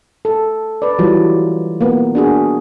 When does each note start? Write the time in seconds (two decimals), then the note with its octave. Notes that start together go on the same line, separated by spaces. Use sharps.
0.25 A4
0.82 B4 D5
0.99 E3 F#3 G3 F4
1.81 A#3 B3
2.15 D4 F#4 G#4